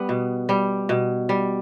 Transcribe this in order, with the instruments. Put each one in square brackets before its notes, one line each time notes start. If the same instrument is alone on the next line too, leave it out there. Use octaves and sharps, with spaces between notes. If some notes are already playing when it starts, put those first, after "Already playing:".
Already playing: [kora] G3 B3
B2
G3
B2
G3